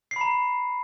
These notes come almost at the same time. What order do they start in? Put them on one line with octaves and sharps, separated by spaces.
C7 B5 A#5